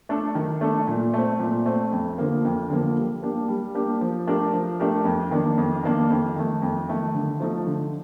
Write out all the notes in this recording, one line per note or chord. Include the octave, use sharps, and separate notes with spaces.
A3 D4 A4
D#3
A3 D4 A4
A#2
A3 C4
A#2
A3 C4
F2
D3 F3 A#3
F2
D3 F3 A#3
G3
A#3 D4 G4
G3
A#3 D4 G4
F3
A3 D4 G4 A#4
F3
A3 D4 G4 A#4
F2
D#3 A#3 D4
F2
D#3 A#3 D4
F2
D#3 A3
F2
D#3 A3
D3
F3 A3 D#4 A4
D3